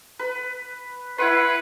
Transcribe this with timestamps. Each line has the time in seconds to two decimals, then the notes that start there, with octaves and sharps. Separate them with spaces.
0.19 B4
1.18 E4 B4 F#5 C6